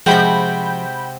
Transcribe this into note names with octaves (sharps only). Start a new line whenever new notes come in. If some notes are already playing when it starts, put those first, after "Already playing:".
C3 F3 G#3 F#4 G5 B5 G6